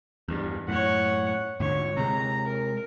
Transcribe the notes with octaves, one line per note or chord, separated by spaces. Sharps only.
E2 G2
F#2 A2 C#5 F#5
G#2 D3 C#5
C3 G#3 A#5
A#4